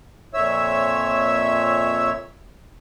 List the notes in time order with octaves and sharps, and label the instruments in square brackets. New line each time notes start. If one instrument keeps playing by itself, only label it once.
[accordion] F2 A#2 C#5 E5 E6